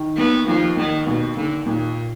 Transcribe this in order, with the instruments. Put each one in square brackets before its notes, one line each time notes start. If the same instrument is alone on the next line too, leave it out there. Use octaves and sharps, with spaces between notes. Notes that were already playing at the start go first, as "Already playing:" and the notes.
Already playing: [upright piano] D#3
[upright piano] D#2 [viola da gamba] B3
[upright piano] D#2 [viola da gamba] F3
[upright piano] D#2 [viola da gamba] D#3
[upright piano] D#2 [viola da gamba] B2
[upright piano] D#2 [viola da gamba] D3
[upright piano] D#2 [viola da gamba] A#2